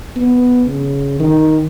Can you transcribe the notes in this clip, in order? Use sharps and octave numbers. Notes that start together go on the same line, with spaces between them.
B3
C#3
D#3